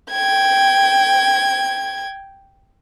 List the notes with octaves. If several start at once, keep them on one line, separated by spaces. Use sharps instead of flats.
G5 G#6